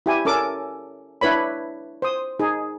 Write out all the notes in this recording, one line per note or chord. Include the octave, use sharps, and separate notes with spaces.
E4 G4 G#5
C#4 A4 A#4 D6
D4 E4 B4 C#5 B5
C5 D#6
D#4 G#4